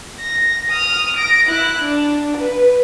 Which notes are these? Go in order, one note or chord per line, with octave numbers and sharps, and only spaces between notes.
A#6
D#6 F6
A#6 D7
E4 F#6
D4
B4